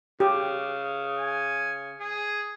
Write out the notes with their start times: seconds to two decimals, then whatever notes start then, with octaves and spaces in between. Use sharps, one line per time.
0.20 C#3 G4
1.19 G#5
2.00 G#4